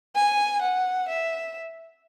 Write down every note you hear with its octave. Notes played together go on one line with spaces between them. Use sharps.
G#5
F#5
E5